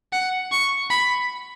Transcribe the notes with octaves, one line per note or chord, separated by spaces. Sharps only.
F#5
C#6
B5